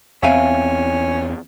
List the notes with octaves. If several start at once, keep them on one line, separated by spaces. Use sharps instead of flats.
E2 C4 C#4 E5 F5 G#5